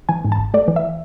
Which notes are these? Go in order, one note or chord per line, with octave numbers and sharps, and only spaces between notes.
E3 G#5
G#2
A5
G#1
A3 D5
E3
E5